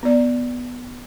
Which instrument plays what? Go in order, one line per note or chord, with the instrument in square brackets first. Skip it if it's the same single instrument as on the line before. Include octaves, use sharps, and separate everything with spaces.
[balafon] B3 D5